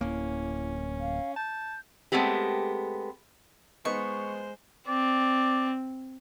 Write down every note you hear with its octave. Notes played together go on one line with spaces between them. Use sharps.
D1 A#3 C#4 E4
F5
A5 G6
G#3 A3 B3 C4 G4
G#3 B3 D#4 C5 C#6
C4 D5